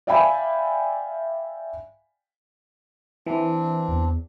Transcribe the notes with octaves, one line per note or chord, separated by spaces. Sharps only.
D5 E5 F5 G5 G#5 B5
E3 C4 D4
E2